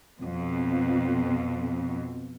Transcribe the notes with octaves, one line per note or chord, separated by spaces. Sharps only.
F2 B2